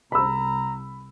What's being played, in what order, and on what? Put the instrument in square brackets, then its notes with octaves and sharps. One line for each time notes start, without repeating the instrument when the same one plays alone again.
[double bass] C2 [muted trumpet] A#5 [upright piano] B5 E6